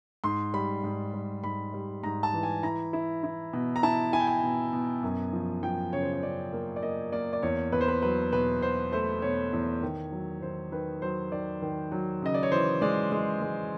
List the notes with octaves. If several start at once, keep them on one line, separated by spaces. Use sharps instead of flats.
G#2 C6
G3 B5
G#2
G3
G#2 B5
G3
G#2 A#5
A5
E3
G#5
E4 A#5
E4
E4
B2
A#5
E4 A5
E4 G#5
G5
G#5
B2
B2
F#2
F3
F3 G5
C#3 C#5
C5
C#5
C#3 D5
A#3
D5
A#3 D#5
A#3 D5
D5
E2 C#5
E2 B4
C5
B4
F#3 B4
B2 B4
B2 C5
A3 C5
B2 C#5
E2
D#3
F#3
D#3 C5
D#3 B4
F#3 C5
D#3 D5
D#3
F#3
C#3 D#5
D5
C#5
E3 C5
G#3 D5
G#3
G#3